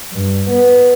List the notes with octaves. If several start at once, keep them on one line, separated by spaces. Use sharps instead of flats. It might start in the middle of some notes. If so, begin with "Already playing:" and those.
G2
B3